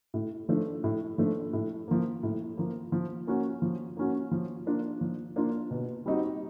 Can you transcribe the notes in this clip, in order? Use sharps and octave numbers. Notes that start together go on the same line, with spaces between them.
A2
F3 A3 D4
A2
F3 A3 D4
A2
F3 A#3
A2
F3 A#3
F3
A#3 C#4 F#4
F3
A#3 C#4 F#4
F3
A#3 D4 F4
F3
A#3 D4 F4
B2
G3 C4 D#4 F#4